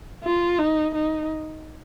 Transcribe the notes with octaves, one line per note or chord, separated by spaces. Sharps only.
F4
D#4
D#4